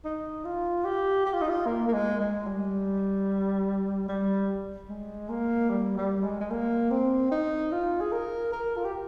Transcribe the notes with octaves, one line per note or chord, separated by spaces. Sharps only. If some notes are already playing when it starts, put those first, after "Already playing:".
D#4
F4
G4
G4
F4
D#4
F4
A#3
A#3
G#3
G#3
G3
G3
G#3
A#3
G3
G3
G#3
G#3
A#3
C4
D#4
F4
G#4
A#4
A#4
F4
G4